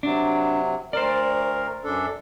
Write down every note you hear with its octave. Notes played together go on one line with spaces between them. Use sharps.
C3 F#3 D4
D2 A#4 C5 D5
F#2 D4 A4